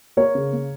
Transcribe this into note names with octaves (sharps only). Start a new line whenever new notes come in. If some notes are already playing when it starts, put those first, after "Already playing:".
A#3 A#4 C#5
C#3
A#3